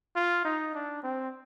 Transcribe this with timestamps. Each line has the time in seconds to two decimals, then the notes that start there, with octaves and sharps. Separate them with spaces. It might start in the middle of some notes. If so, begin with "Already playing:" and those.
0.16 F4
0.45 D#4
0.74 D4
1.03 C4